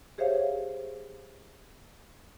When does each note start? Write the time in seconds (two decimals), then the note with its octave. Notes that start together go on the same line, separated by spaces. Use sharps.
0.18 G4 G#4 C5 C#5 E5 F5